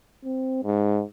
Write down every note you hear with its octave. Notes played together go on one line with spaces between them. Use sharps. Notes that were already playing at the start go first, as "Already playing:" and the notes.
C4
G#2